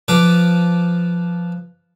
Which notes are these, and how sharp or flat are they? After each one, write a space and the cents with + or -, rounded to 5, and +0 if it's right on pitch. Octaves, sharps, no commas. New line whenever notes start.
F3 +0 B4 +0 D6 +0